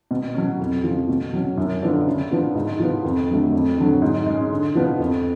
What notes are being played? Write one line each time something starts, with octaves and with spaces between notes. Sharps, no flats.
B2
F#3 C#4
F2
C#3 F3
B2
F#3 C#4
F#2
D3 F3 B3 D4
C#3
F3 B3 D4
G#2
F3 B3
F2
D3 F#3 A3
F2
D3 F#3
G#2
G#3 C#4
D3
F3 B3 D4
F2